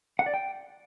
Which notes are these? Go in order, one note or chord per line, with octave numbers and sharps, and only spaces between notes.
F#5
D5
G5